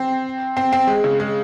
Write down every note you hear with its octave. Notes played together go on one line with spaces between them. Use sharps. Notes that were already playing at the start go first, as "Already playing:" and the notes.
Already playing: C4
C4
C4
G#3
C#3
G#3